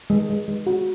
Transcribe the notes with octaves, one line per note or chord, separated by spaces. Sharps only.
G#3
G#3
G#3
F#4